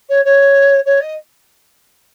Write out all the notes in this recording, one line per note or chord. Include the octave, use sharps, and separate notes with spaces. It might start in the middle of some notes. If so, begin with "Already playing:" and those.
C#5
C#5
C#5
D#5